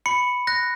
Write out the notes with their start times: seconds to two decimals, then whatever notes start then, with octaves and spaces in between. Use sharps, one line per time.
0.06 B5 C#7
0.47 F#6 A#6